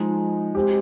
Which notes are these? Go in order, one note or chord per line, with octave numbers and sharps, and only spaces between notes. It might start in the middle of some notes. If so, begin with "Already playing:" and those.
Already playing: F3 G#3 D#4 G#4 D#5
G#3 C4 G4